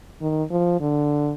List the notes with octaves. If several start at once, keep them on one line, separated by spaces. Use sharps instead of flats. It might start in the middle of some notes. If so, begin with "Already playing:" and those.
D#3
F3
D3